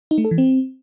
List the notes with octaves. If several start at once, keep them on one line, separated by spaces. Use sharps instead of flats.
D#4
A3
A4
E3
C4